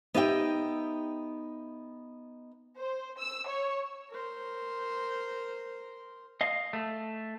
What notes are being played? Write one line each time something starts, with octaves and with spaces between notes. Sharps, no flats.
B3 D#4 E4 G4 E5 G5
C5
E6
C#5
A#4 C5
D#5 F5
A3